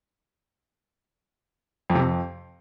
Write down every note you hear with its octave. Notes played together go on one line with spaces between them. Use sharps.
F2
C3
F2